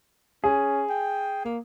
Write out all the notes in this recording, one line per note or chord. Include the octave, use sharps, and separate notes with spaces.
C#4 G#4
G5
A#3